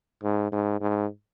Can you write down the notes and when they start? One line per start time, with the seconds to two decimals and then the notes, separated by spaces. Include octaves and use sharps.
0.23 G#2
0.52 G#2
0.81 G#2